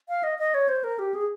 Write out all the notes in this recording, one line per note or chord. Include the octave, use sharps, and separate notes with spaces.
F5
D#5
D#5
C#5
C5
A#4
G4
G#4